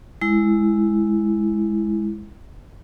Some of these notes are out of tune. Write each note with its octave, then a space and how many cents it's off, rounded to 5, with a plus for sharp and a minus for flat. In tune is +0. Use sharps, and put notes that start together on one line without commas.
G#3 +0 E4 +0